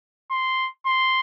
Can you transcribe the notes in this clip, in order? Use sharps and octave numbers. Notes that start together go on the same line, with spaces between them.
C6
C6